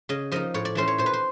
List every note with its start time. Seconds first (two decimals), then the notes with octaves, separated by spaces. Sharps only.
0.09 C#3 D#5
0.32 F3 A#3 D#4 D#5
0.54 A2 C#5
0.65 D5
0.75 E3 A3 C#4 C5
0.88 C#5
0.98 A#2 C5
1.06 B4
1.13 C5